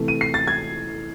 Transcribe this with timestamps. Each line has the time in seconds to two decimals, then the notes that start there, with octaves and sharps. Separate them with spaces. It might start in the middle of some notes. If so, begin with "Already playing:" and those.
Already playing: C3 E3 A3
0.08 D#7
0.21 C7
0.34 A6
0.48 G#6